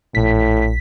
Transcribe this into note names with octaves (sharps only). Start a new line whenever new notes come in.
A#1 A2 B6